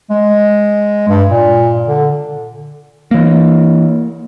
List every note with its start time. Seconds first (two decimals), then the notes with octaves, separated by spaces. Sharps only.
0.10 G#3
1.08 G2
1.29 A#2
1.87 D3
3.11 E3 A#3